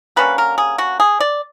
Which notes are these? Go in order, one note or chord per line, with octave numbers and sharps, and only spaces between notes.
D3 G3 A#3 C#4 B4
A#4
G#4
F#4
G#4
D5